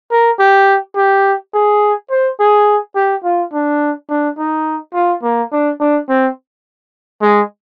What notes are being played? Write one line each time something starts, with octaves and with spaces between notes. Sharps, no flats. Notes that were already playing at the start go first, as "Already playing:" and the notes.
A#4
G4
G4
G#4
C5
G#4
G4
F4
D4
D4
D#4
F4
A#3
D4
D4
C4
G#3